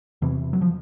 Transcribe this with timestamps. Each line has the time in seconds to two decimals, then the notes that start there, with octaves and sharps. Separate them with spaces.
0.22 E2 C3 E3
0.53 F#3
0.61 F3